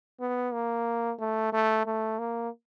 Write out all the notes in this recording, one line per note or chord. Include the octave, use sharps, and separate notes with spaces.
B3
A#3
A3
A3
A3
A#3